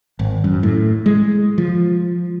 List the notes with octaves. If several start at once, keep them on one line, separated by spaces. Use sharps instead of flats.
G#1
F#2
A2
G#3
F3